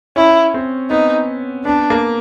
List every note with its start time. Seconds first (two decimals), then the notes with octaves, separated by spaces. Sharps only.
0.16 C#4 E4
0.54 C4
0.90 B3 D#4
1.65 B3 D4
1.90 A#3